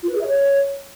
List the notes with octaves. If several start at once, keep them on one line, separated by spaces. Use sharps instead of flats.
F4
B4
G#4
E5
C#5